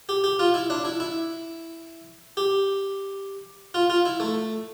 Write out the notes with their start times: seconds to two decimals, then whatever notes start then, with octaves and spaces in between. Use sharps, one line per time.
0.09 G4
0.24 G4
0.39 F4
0.54 E4
0.70 D4
0.85 E4
1.00 E4
2.37 G4
3.74 F4
3.90 F4
4.05 E4
4.20 A3